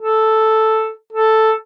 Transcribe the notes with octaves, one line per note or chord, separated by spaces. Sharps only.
A4
A4